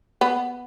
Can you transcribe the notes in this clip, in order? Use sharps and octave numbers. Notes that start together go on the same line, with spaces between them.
B3